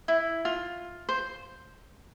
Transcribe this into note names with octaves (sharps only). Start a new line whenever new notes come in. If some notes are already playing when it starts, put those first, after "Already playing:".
E4
F4
C5